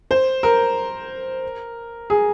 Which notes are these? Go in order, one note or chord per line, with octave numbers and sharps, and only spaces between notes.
C5
A#4
G#4